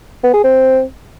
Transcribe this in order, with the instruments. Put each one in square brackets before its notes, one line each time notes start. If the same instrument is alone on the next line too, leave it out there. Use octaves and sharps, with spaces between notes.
[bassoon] B3
G#4
C4